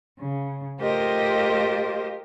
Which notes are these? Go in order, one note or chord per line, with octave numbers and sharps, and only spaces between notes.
C#3
A3 F4 G4 A#4 C5 D#5